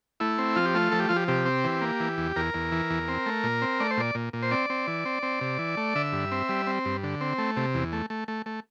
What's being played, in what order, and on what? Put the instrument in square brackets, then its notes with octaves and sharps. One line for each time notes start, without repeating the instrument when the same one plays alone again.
[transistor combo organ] A3 E4
C4
F3 F4
G4
A3 F4
F3 A4
G4
F3 F4
G4
C3 G4
C4
E3
A#3
E3
E2
E2 A#4
E2
E3
E2
C4
A3
A#2
C4
A3 D5
C5
A#2 D5
A#2
A#2
C5
C4 D5
C4
E3
C4
C4
C3
E3
A3
D3 E5
G2
C4
G3
C4
G2
D3
C4
A3
C3
E2
A3
A3
A3
A3